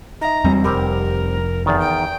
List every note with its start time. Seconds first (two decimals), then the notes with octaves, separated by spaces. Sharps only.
0.21 D#4 E5 A#5
0.44 E2 G3 C4
0.64 F1 G3 C4 G4 A#4
1.66 E2 D#3 D5
1.80 G5